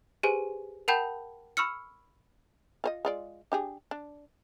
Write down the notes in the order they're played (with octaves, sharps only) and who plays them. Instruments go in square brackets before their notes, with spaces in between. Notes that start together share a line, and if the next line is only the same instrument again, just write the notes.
[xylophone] G4 G#4 B4 C5 G#5
A#4 F#5 G5 A5 B5 G6
B5 C#6 E6 F6 C#7
[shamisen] F4 C5 D#5
G#3 F4 D5
D4 G4 G#4
D4